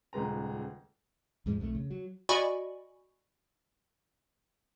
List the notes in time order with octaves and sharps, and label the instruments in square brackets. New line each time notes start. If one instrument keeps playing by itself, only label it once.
[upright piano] D#1 C#2 G#3 B4 A#5
[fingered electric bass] E2 G#2 F3 G#3
B1 F2 F#3 A3
C#3
F#3
[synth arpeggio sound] F#4 D5 D#5 G#5 B5 C#6